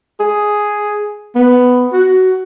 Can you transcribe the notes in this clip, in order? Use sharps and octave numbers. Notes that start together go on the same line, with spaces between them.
G#4
B3
F#4